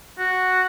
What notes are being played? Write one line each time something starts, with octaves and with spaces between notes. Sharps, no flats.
F#4